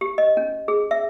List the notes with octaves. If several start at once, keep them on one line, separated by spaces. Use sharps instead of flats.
G4
D#5
C#4
G#4
E5